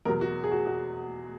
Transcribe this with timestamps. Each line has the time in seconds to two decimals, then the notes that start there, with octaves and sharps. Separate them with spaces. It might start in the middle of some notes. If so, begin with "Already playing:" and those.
0.05 E2 B2 F#3 A#4
0.21 F#4
0.44 G#4
0.51 F#4
0.66 F#4